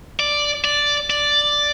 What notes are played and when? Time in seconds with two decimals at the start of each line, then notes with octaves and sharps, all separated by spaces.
0.19 D5
0.64 D5
1.10 D5